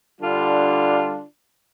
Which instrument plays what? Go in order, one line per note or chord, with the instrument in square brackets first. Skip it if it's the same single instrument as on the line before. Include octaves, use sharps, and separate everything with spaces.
[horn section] D3 G3 D4 F4